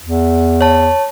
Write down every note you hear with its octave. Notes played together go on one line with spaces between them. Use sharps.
E2
C#5 A5